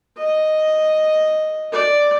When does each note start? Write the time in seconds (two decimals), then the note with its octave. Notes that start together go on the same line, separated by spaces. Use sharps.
0.17 D#5
1.72 D5